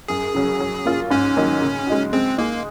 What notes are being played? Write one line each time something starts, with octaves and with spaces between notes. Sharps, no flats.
F#2 G#4
C#3 F#3 C#4
F#3
A#3 C#4 F4
G#2 C#4
D#3 F#3 A#3 D#4
C#3
G#3 D#4 F#4
G#3 C4
A#3 D#4 G#4